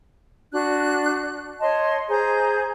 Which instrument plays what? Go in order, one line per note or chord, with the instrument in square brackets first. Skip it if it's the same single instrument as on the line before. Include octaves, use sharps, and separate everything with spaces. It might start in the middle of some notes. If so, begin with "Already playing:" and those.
[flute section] D4 F#4 F#6
C#5 D#5 A5 C6
G#4 C5 A#5 G6